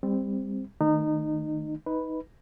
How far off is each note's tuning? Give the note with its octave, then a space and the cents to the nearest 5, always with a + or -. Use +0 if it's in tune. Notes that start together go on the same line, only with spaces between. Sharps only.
G3 +30 C4 +0
D#3 +0 A3 +15 D#4 -25
D#4 +20 B4 +0